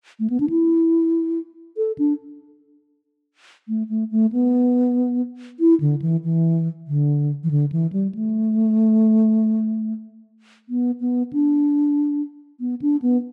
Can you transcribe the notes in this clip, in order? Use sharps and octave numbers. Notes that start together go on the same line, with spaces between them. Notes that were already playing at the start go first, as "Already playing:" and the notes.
A3
B3
D4
E4
A4
D4
A3
A3
A3
B3
E4
D3
E3
E3
D3
E3
D3
E3
G3
A3
B3
B3
D4
B3
D4
B3